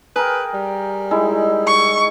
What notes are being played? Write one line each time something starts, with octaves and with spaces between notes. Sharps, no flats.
G#4 A#4 B4 G5
G3
G#3 D#4 E4
C#6